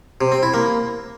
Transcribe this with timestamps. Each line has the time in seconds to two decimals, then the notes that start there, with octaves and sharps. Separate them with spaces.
0.21 C3
0.32 C4
0.43 E4
0.54 A#3